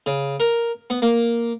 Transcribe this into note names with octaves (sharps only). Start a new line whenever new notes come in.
C#3
A#4
B3
A#3